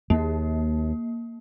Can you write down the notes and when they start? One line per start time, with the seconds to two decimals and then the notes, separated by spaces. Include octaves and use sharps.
0.10 D#2 A#3